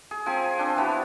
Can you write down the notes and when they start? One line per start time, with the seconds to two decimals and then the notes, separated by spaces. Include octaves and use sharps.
0.11 G#4
0.26 F3 C4 G#5
0.58 C4 D4 G5
0.76 E3 B3 F#4